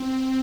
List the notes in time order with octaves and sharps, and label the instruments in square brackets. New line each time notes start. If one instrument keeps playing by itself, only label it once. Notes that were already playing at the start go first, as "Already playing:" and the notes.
Already playing: [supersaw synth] C4